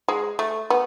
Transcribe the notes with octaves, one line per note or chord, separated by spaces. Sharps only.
G#3
A3
B3